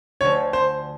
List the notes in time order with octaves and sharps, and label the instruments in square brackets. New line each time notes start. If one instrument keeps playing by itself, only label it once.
[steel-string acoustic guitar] D2 D3 F3 [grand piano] C#5
[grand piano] C5